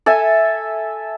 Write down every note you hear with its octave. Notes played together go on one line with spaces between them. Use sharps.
A4 E5 G#5